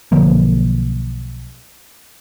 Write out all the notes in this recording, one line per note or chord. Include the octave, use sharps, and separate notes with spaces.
B1 D3 F3 A#3